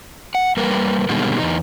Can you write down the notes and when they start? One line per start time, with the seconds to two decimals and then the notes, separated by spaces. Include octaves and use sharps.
0.35 F#5
0.57 G3 A#3 A#4 B4
1.09 B2 D3 D#3 G3 G#3 A#3
1.38 E2 D#4